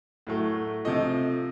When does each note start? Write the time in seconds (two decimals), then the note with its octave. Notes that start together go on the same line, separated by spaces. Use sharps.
0.27 A2 F#3 A3
0.84 C3 F3 A3 D#5